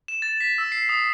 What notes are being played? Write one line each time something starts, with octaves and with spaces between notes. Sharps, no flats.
E7
A6
B6
E6
C7
D#6